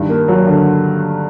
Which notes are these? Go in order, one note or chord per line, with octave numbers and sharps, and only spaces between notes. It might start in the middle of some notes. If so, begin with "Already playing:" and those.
Already playing: G2 D#3
A#3
F#3
D3